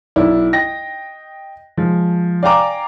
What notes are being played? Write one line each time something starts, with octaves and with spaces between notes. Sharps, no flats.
B1 E4 D5
D#5 G5 A#6
F3 G#3
D5 F5 G5 G#5 A#5 D6